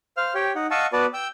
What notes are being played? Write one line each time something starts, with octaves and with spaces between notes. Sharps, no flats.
C5 F5 F6
G4 C#5 G5
D#4 F#5
D#5 F5 F#5 A5 C#6 E6
B3 F#4 B4 D5 A5
G5 E6 G6